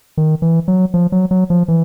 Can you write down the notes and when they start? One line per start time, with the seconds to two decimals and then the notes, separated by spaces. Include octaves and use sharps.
0.17 D#3
0.42 E3
0.68 F#3
0.94 F3
1.12 F#3
1.31 F#3
1.50 F3
1.68 E3